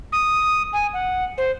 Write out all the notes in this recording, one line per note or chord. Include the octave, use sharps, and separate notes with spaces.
D#6
G#5
F#5
C5